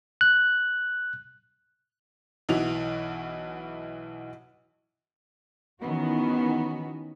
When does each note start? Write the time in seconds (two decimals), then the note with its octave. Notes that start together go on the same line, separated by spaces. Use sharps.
0.21 F#6
2.49 B1 E3 E4 F#4 F7
5.80 D#3 E3 B3 C#4 F#4